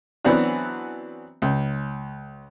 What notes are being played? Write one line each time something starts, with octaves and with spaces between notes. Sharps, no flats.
E3 F#3 B3 C4 D4 F#4
C#2